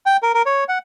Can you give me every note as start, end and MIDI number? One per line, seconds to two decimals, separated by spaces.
0.06 0.17 79
0.23 0.32 70
0.34 0.42 70
0.46 0.64 73
0.68 0.78 78